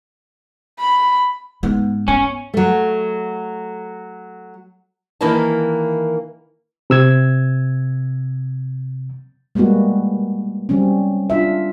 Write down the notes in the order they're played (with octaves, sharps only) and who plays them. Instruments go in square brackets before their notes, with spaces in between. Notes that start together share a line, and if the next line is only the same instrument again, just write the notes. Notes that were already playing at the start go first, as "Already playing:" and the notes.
[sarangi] B5
[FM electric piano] G#2 [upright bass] B3
[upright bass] B3 [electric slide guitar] C#4
[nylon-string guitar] F#3 A3
D#3 E3 A#3 B4 D#5 A5
[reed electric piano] C3 E6 G#6
[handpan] G3 G#3 A#3 B3 F#4
F#3 G3 C4 C#4
D4 F4 E5